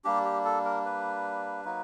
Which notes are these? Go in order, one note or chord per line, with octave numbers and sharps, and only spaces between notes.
G3 A#3 D4 G4
G4
A4
A#4
B4
F#3 A#3 D#4